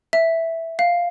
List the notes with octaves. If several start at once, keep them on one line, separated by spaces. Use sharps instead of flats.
E5
F5